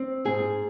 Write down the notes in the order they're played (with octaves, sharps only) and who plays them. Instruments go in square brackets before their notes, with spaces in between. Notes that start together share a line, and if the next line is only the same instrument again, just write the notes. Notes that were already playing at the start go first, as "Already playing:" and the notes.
Already playing: [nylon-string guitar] C4
G#2 G#4